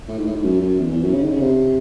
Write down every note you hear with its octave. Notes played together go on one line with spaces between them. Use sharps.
A2
G#2
A2
G#2
F#2
F#2
E2
E2
F#2
C#3
D#3
C#3
C3